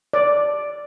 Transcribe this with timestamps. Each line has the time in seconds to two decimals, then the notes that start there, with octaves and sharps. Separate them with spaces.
0.13 D5